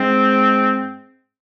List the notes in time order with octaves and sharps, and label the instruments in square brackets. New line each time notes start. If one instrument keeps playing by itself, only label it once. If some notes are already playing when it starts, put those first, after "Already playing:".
Already playing: [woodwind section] G#2 G#3 C4